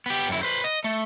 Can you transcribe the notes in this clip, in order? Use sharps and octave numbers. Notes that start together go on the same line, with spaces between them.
B3 G4
F#2 E4
B4 C5
D#5
A3